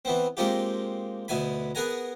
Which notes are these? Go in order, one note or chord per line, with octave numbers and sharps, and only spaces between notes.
E3 B3 C4
G#3 A#3 C4 D#4 F4 G4
D2 B2 E4 G#5 B5
B3 G#4 A#4 F#5 G#5 A#5